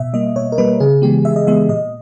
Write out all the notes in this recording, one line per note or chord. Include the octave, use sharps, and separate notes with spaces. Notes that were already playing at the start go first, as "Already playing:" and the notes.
Already playing: B2 E5
G3 A#3 D#5
B2 C#5
A#4
G3 A#3 B4
C#3 G#4
E3 G#3 B3 G4
C#3 E5
D#5
E3 G#3 B3 E5
A#2 D#5